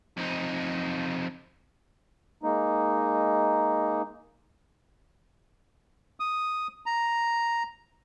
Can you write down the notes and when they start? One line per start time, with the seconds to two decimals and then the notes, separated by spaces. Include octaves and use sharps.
0.17 F2 D#4
2.43 G#3 A#3 D#4
6.20 D#6
6.86 A#5